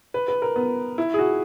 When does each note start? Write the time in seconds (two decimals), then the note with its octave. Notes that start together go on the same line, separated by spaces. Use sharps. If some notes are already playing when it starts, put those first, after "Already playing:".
0.14 B4
0.28 B4
0.42 A#4
0.56 B3
0.98 E4
1.14 G#4
1.19 F#4